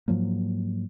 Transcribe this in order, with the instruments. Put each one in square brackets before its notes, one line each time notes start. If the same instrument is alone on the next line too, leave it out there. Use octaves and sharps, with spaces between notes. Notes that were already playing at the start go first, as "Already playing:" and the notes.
[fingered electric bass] G#2 F3 F#3 A#3